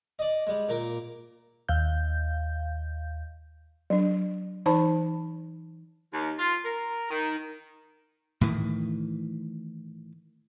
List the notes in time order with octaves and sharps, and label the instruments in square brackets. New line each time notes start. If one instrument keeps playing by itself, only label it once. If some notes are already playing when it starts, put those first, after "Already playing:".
[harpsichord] D5 D#5
G3 G#3
A#2 A#3 A#4 G5
[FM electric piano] D#2 F5 G6
[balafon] F#3 D4
E3 D#4 C5 A5 B5
[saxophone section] D#2
F4
A#4
D#3
[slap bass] A2 D#3 E3